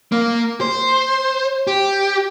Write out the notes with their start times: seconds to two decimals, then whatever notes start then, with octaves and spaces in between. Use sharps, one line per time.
0.12 A#3
0.61 C5
1.67 G4